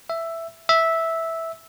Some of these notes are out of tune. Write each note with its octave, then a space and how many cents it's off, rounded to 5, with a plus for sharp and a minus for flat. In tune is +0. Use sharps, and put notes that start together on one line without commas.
E5 +5
E5 -10